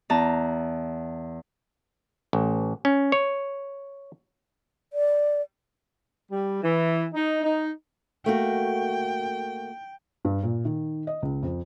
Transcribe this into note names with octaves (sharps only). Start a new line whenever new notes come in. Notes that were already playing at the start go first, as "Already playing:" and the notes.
E2 A5 A#5
A1
C#4
C#5
D5
G3
E3
D#4
D#4
A3 A#3 F#4 G5
G2
A#2
D#3
D#5
C#2
F2